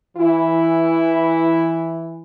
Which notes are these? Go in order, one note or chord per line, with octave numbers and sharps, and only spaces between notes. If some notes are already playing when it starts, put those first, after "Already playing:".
E3 E4